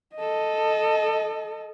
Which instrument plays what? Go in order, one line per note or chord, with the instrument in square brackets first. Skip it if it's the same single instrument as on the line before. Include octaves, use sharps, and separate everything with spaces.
[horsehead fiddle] A4 D#5